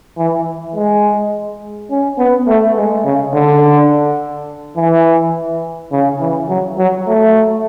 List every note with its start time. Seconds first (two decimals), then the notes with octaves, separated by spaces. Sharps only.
0.17 E3
0.76 G#3
1.90 C#4
2.19 B3
2.47 A3
2.77 G#3
3.05 C#3
3.34 D3
4.77 E3
5.92 C#3
6.20 E3
6.49 F#3
6.78 F#3
7.07 A3